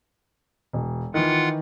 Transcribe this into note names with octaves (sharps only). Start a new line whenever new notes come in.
E1
D#3 E3 F4 F#5